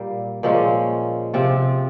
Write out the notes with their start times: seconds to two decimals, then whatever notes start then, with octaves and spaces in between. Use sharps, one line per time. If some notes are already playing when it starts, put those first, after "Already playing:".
Already playing: A#2 G3 A#3
0.43 A#2 F3 G#3 C#4
1.34 C3 F3 C4 F4